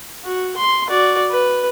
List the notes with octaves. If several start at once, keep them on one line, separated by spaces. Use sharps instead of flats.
F#4
C6
F#4 D5
B4